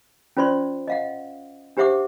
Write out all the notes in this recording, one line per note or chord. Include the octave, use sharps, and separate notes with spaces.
C#4 F4 C5 D5 C6
D#5 F5 F#5
D4 G4 C5 E5 F#5 D6